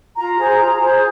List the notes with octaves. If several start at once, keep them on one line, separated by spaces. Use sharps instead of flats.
F4 A#5
G#4 C5
F4
G#4 C5